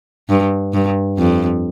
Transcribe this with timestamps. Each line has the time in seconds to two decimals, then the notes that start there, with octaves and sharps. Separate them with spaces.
0.29 G2
0.73 G2
1.18 F2